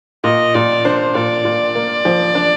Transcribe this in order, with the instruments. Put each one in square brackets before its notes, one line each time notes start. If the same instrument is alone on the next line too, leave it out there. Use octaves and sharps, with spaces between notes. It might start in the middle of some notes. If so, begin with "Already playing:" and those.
[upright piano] A#2 [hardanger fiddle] D#5
[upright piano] A#2 [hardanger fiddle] D5
[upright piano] D4 [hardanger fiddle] C5
[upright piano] A#2 [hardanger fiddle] D5
[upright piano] A#2
A#3
F3
D4